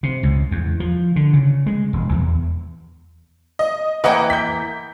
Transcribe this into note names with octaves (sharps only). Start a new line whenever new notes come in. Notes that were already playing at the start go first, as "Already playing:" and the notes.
C3
C#2
E2
F3
D3
C#3
G#3
E1
E2
D#5
E3 A#3 B4 D#5 F#5 G5
G6 B6